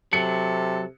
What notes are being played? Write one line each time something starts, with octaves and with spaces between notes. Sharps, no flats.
C3 F#3 A4 C#7